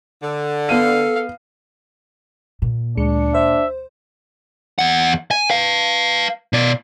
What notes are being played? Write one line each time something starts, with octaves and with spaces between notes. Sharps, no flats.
D3
B3 A4 F5 D#7
A#2
D2 G#3 D4 C#7
C5 E5
E2 F#5
G#5
B4 F5
B2 D5